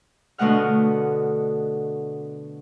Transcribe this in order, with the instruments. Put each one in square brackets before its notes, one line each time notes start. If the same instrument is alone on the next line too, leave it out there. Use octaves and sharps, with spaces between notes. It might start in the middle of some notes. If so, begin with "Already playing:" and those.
[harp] B2 D3 A3 D#5 F#5 F6